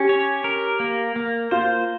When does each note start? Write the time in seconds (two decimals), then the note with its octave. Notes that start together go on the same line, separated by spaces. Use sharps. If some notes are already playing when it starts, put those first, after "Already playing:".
Already playing: C#4 G4
0.09 C#5
0.44 A#4
0.80 A#3
1.16 A#3
1.51 F4 C5